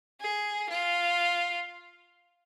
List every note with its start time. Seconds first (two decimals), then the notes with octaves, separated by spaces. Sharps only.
0.21 G#4
0.69 F4